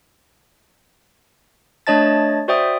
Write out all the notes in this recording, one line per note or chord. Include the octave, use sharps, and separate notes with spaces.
A3 D4 C#5 D#5 A5 A6
F#4 C5 D5 E5 G5 D#6